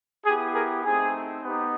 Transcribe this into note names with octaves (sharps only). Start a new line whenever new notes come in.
B3 E4 G4 G#4
G#4 A#4
A3 C4 D#4 G#4
B3 D#4 G4